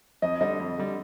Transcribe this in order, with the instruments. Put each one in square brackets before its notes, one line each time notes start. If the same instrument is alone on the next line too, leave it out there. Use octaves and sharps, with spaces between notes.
[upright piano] F2 [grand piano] D#5
[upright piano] D3 G3 [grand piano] D#5
[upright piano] F2
D3 G3